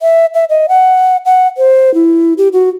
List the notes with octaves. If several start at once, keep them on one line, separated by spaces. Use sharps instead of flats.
E5
E5
D#5
F#5
F#5
C5
E4
G4
F#4